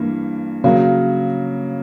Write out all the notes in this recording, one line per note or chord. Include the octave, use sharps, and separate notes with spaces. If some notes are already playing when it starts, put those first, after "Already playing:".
Already playing: G2 E3 A#3
C#3 F#3 A#3